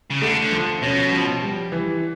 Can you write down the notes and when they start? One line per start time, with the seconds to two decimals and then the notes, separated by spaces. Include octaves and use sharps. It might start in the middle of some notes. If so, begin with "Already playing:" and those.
0.11 C#3
0.22 D3 A3
0.42 D3
0.52 F3
0.82 B2 C#4
1.12 F3
1.42 G3
1.72 E3